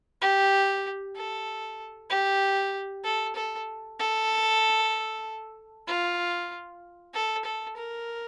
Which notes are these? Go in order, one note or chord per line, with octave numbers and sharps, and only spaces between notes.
G4
A4
G4
A4
A4
A4
F4
A4
A4
A#4